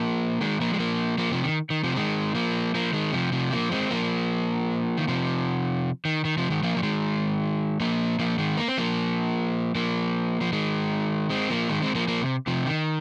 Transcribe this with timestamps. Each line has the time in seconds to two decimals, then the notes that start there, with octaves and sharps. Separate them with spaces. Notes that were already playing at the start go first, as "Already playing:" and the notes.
Already playing: F3 A#3
0.41 D#3 G#3
0.61 F3 A#3
0.74 G#3
0.80 F3 A#3
1.18 F3 A#3
1.31 C3 F3
1.44 D#3
1.70 D#3
1.84 C3 F3
1.96 D#3 G#3
2.35 F3 A#3
2.75 F3 A#3
2.93 D#3 G#3
3.13 C3 F3
3.32 C3 F3
3.52 F3 A#3
3.71 G#3 C4
3.91 F3 A#3
4.98 D#3
5.08 C3 F3
6.05 D#3
6.25 D#3
6.38 C3 F3
6.50 D#3 G#3
6.63 F3 A#3
6.77 F3
6.83 D#3 G#3
7.80 F3 A#3
8.19 F3 A#3
8.38 D#3 G#3
8.58 A#3
8.68 C4
8.77 F3 A#3
9.75 F3 A#3
10.41 F3
10.53 D#3 G#3
11.30 G#3 C4
11.50 F3 A#3
11.69 D#3 G#3
11.82 G#3 C4
11.95 F3 A#3
12.08 F3 A#3
12.22 C3
12.47 C3 F3
12.67 D#3